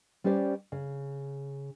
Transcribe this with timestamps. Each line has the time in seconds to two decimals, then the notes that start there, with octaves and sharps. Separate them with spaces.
0.24 G3 C#4 G4 C5 D5
0.72 C#3